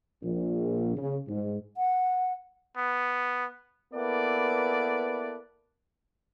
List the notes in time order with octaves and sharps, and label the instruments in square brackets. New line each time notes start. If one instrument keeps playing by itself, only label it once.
[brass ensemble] A#1
C#3
G#2
[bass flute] F#5
[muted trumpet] B3
[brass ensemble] A#3 B3 E4 A4 B4 D5